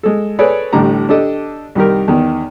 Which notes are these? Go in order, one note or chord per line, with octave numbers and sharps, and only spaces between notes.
G#3 A4
G#4 A4 B4 C#5 D5
A1 A2 D3 G3 A#5
D4 G4 A4 D#5
C2 D#3 G4 A#4
E2 D#3